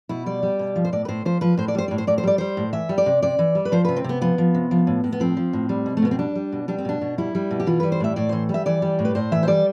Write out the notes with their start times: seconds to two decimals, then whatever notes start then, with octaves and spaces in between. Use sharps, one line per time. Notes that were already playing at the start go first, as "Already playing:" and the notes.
0.09 B2 E4
0.26 G3 D5
0.43 G3
0.59 B2
0.76 F3
0.85 C5
0.92 A2 D5
1.05 B4
1.08 A2 C5
1.25 F3 C5
1.41 F3 B4
1.57 A2 C5
1.68 D5
1.75 G3 C5
1.88 A2 D5
1.98 C5
2.07 A2 D5
2.18 C5
2.24 G3 D5
2.38 G3 C5
2.57 A2
2.73 E3 E5
2.89 G3
2.98 D5
3.06 C3
3.22 C3 D5
3.39 E3
3.55 G3
3.65 B4
3.72 F3 C5
3.85 C3 B4
3.96 C4
4.04 C3 B3
4.21 F3 B3
4.38 F3
4.54 C3
4.71 F3
4.87 A2
5.04 A2
5.12 B3
5.20 F3 C4
5.37 F3
5.53 A2
5.69 G3
5.86 B2
5.97 A3
6.02 B2 B3
6.11 C4
6.19 G3 D4
6.35 G3
6.52 B2
6.68 G3 D4
6.78 C4
6.85 B2 D4
7.01 B2
7.18 G3 E4
7.35 G3
7.51 B2
7.60 G4
7.67 E3 F4
7.80 G3 B4
7.92 C5
8.00 A2 E5
8.16 A2 D5
8.29 E3 C5
8.49 G3
8.54 E5
8.66 E3 D5
8.82 G3
8.99 A2
9.05 B4
9.15 A2 C5
9.32 E3 E5
9.43 C5
9.47 G3 D5